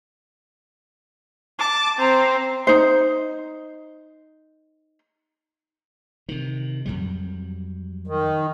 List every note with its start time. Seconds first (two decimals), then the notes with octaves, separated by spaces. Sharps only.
1.59 A5 D6
1.99 C4 A#5
2.67 D#4 C5
6.29 C3 D#3
6.85 F2 F#3 G3
8.07 D#3